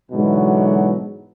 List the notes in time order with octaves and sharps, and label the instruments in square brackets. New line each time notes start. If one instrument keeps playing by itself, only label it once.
[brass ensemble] G#2 B2 D3 E3 F#3